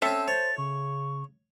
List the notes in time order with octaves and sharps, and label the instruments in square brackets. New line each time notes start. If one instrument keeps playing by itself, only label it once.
[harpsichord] C4 C#4 [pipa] A4 E5 A5 [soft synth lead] E6
[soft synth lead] C5 [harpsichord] C#5 [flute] A6
[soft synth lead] C#3 [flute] C#6